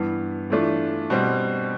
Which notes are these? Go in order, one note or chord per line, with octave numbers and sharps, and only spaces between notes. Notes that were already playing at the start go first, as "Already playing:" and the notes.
Already playing: G2 E3 B3
E3 A3 D4 F4
B2 G3 C4